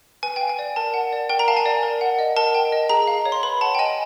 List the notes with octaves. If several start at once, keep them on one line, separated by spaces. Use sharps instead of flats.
B4 G#5
G5
F5
G#5
D5
A#4 A5
F#5
D5
A#4 G5
A#5
F5 A5
G#5
D5
A#4
F#5
D#5
A#4 A5
G5
D#5
G#4 A#5
F5
C#5
C6
B4 B5
F#5 A5
G5
D#5 G#5